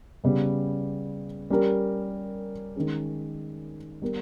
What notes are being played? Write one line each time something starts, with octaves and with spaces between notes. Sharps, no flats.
C#3 G3 B3
G3 C#4 G4 A#4
D#3 G#3 C#4 G#4
G3 B3 G4 A#4